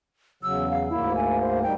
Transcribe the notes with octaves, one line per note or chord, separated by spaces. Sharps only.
E2 C#3 F#3 E6
F5
D2 G#2 A#3 E4
G#5
C5
G3 D#4 G5